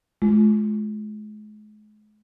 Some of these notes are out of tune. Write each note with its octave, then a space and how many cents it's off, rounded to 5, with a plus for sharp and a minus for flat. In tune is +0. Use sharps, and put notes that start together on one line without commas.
G#3 +40 F4 +0